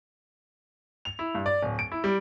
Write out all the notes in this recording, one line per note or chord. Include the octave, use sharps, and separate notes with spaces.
F7
E4
G2
D5
D1
D7
E4
G3